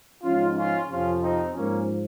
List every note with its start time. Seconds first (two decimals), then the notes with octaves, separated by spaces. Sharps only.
0.23 G#2 F3 C#4 F4
0.56 C#4 F4
0.89 F2 C3 F3 C#4 F4
1.21 C4 D#4
1.54 G#2 F3 A#3 C#4